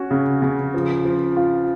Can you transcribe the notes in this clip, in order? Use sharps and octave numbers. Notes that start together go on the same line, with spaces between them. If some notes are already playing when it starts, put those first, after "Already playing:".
Already playing: C#4 F#4
C#3
C#3
F3
F3
F4